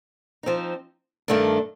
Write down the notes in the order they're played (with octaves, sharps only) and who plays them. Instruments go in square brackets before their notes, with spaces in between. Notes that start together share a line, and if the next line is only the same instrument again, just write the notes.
[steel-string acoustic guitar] F3 C4 D#4
G2 D#3 A3 D4